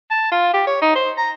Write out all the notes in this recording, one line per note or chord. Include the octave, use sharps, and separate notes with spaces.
A5
F4
G4
C#5
D#4
C5
A#5